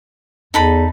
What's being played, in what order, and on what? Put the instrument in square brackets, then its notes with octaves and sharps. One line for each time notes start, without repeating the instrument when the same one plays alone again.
[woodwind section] E2 [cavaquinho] D#4 A4 B5